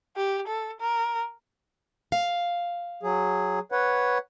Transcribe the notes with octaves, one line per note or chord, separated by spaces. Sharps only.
G4
A4
A#4
F5
F#3 G#4
B4 C#5 F#5